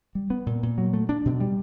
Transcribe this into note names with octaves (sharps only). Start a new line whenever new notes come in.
G3
B3
A#2
A#2
F#3
A3
D4
B2
G3